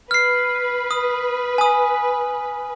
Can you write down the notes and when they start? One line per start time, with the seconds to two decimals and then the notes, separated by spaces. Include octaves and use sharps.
0.11 B4 F6 C7
0.91 D#6
1.58 G#5 D#6